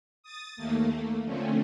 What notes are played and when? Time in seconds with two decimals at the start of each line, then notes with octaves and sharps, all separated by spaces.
0.23 D#6 A6
0.57 D#2 A3 A#3
1.24 D3 F3 A3 C4 C#4